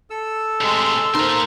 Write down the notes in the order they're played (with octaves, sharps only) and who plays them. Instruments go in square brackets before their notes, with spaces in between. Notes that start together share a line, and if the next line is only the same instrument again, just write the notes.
[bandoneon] A4 E6
[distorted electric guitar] A2 C3 [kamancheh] G#3 C6
[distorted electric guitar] A#3 C6 [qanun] D#4 [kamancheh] A#4 C5